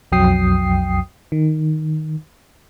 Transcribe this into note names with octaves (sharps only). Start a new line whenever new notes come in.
B1 F2 F#3 G5 D#6 C7
D#3